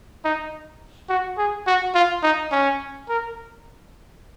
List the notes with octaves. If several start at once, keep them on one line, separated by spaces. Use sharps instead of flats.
D#4
F#4
G#4
F#4
F4
D#4
C#4
A#4